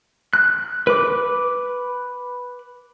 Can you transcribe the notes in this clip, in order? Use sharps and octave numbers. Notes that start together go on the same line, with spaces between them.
F#6
B4 D6